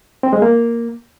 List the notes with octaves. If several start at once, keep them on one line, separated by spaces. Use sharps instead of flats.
C4
G#3
A#3